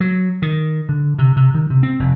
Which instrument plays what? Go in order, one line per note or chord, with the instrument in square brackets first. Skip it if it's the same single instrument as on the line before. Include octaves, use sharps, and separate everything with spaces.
[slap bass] F#3
D#3
D3
C3
C3
D#3
C3
C4
F1